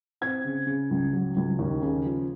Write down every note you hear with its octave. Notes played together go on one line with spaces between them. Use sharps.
C4 G#6
C#3
C#3
C#2
F#3
C#2
D#2
C#3
F3